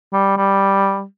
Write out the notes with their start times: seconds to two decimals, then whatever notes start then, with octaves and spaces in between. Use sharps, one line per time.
0.13 G3
0.37 G3